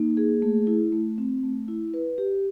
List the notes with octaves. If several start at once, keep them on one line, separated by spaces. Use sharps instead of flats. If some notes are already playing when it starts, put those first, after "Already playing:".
Already playing: A#3 D#4
G#4
A3
E4
A3
C4
A3
E4
B4
G4